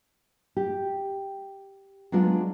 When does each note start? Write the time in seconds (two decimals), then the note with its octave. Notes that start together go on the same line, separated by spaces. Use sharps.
0.56 G4
2.12 F#3 G#3 B3 D4 F4 D5